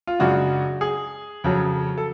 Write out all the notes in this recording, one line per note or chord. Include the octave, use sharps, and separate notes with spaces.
F4
F#2 C#3 G#3 D4 F#4
G#4
F2 C#3 F#3
A4